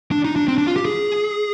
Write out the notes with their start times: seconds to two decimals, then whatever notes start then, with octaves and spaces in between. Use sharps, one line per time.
0.12 D4
0.25 D#4
0.36 D4
0.48 C4
0.58 D4
0.67 F4
0.76 G4
0.85 G#4